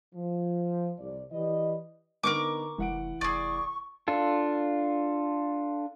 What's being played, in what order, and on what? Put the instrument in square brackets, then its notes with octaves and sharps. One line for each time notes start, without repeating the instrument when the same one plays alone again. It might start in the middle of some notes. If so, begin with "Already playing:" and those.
[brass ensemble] F3
C2 D5
E3 G4 B4 D5 D#5
[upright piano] D3 B3 D#4 [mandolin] A#4 C#6 D6
[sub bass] F1 [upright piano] E3 F#5 D7
[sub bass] F1 [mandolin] G#4 D5 [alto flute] C#6
[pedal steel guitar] D4 F4 A4